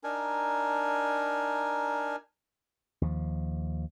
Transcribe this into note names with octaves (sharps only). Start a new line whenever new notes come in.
D4 D#4 A#4 G#5
D#2 F3